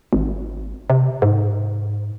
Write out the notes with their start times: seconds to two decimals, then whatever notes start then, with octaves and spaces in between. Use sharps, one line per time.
0.13 G#1
0.90 C3
1.22 G#2